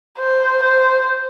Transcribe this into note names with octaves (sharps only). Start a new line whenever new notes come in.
C5
C5